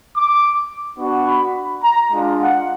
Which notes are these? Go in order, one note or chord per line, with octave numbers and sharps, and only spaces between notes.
D6
B3 D4 F#4
B5
A#5
G#3 D4 F4
F#5